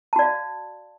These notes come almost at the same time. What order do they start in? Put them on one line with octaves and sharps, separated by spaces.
A5 F#4 D5 F5